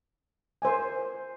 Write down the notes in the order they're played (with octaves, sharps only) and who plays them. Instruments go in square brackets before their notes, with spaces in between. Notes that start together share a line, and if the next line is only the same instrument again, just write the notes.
[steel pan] A#4 C5 E5 G#5